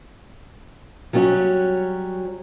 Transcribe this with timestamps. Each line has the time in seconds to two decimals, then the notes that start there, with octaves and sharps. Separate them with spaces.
1.13 F#3 G3 C#4 F#4